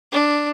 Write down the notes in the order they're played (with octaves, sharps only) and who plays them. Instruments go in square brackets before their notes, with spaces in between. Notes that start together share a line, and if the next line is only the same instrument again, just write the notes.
[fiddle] D4